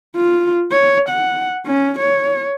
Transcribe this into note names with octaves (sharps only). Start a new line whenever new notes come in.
F4
C#5
F#5
C#4
C#5